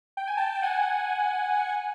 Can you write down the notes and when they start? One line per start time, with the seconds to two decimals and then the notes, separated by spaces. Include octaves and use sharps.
0.17 G5
0.27 G#5
0.37 G5 A5
0.55 G5
0.62 F#5 G#5